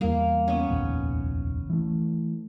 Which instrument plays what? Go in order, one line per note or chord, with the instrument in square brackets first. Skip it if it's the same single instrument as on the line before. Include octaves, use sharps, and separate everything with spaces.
[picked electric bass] E2 G3 [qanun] A#3 F5
[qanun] B3 C#4
[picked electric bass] F1 A#1 D#2
E3 A3